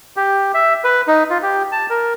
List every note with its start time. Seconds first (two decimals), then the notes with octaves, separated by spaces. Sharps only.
0.17 G4
0.54 E5
0.84 B4
1.08 D#4
1.30 F4
1.42 G4
1.72 A5
1.90 A#4